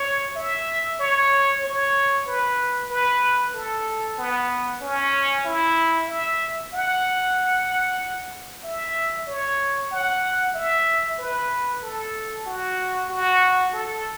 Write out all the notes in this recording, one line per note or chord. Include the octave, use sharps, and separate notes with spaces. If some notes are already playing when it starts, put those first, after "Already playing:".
Already playing: C#5
E5
C#5
C#5
B4
B4
A4
B3
C#4
E4
E5
F#5
E5
C#5
F#5
E5
B4
A4
F#4
F#4
A4